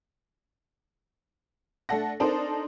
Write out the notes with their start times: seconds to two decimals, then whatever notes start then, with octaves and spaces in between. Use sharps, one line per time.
1.89 A3 D4 A4 F#5 A#6
2.20 C4 D4 D#4 A4 A#4 C5